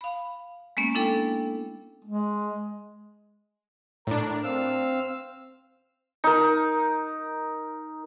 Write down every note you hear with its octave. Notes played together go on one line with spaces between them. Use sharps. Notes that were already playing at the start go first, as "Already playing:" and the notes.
F5 B5
G#3 A#3 B3 C#4
D4 E4 A4 G5
G#3
A2 D4 A#4
C4 F5 E6
D#4 A#4